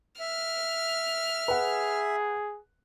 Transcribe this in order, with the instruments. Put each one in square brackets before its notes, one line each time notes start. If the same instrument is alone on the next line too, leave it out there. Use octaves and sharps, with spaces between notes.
[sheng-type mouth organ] E5 [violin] F6
[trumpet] G#4 [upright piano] B4 F#5